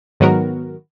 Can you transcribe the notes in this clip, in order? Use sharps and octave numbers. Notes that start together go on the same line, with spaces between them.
G#2 D#3 F#3 B3 F#4 A#4